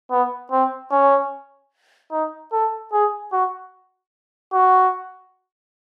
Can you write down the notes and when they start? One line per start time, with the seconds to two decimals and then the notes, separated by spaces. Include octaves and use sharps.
0.11 B3
0.52 C4
0.91 C#4
2.12 D#4
2.53 A4
2.93 G#4
3.33 F#4
4.53 F#4